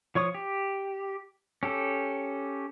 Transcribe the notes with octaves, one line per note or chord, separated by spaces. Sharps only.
F3 C#5 C#6 D#6
G4
C#4 G4 A4